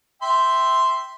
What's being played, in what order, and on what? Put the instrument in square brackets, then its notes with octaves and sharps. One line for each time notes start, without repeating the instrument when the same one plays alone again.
[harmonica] E5 G5 C6